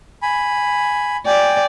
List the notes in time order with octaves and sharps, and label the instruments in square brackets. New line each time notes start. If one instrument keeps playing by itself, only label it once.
[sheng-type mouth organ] G#5 B5
[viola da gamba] D5 [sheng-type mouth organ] G5 G#5